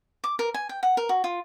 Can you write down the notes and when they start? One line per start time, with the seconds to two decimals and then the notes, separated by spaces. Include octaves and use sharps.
0.24 D6
0.39 A#4
0.54 G#5
0.69 G5
0.83 F#5
0.97 A#4
1.09 F#4
1.24 F4